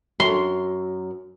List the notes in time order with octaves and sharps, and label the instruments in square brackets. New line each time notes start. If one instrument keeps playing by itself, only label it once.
[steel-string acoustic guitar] F#2 [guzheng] C6